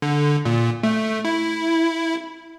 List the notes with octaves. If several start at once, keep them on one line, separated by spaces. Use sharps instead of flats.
D3
A#2
A3
E4